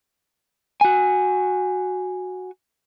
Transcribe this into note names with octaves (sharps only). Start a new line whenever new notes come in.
F#4 G#5